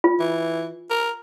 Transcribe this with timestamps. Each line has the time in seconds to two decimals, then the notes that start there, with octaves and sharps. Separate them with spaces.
0.04 F4
0.20 E3
0.90 A#4